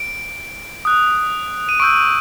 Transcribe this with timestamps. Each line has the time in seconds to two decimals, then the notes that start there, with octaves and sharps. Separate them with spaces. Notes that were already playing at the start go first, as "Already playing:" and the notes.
Already playing: D7
0.85 D#6 F#6
1.69 D#7
1.80 C#6 E6 G6 D7